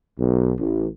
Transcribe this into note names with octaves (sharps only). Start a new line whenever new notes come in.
B1
A1